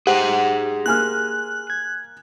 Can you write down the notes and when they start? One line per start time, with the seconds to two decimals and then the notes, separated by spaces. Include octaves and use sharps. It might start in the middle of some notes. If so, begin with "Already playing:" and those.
0.07 G4 G#4 C5 F#5
0.86 A#3 G#5 F6 F#6
1.70 G#6